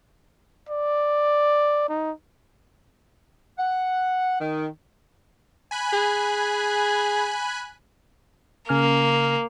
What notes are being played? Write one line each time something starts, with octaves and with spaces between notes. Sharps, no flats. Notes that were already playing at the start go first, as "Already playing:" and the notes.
D5
D#4
F#5
D#3
G#5 B5 F#6
G#4
C#3 A#3 G#5 F6